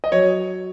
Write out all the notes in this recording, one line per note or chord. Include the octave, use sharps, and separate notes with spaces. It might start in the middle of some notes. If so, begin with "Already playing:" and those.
D#5
F#3 C#5